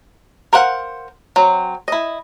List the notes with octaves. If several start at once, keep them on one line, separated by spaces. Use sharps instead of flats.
A#4 C5 F5 F#5
F#3 C4
E4 D#5